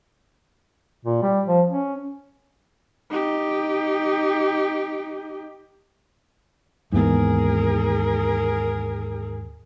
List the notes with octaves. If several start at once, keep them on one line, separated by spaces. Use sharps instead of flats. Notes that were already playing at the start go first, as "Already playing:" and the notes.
A#2
G3
F3
C#4
D#4 G4
D#2 G#2 E3 B3 G#4 A#4